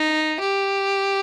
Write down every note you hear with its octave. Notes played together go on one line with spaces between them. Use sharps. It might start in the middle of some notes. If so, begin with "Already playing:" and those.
Already playing: D#4
G4